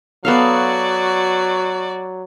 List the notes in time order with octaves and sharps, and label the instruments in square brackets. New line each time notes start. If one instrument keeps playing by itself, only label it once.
[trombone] F#3 [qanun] B3 A4 F5 [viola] F#4 D5